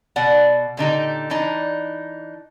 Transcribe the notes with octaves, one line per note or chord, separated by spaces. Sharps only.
B2 D5 F#5
A#2 D3 D#4 G4
E3 D4 D#4